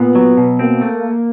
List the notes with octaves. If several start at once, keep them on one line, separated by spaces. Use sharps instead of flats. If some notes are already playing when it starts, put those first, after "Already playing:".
Already playing: A#2 B3
F#3
B2
A#3 C4
A3